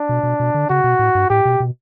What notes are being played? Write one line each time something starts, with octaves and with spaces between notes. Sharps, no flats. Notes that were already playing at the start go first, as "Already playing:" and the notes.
Already playing: D4
B2
B2
B2
D3
C#3 F#4
B2
A2
G2
A2 G4
B2
B2